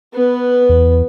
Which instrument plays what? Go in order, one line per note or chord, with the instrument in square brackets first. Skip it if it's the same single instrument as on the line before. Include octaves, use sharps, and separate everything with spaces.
[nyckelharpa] B3 B4
[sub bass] E2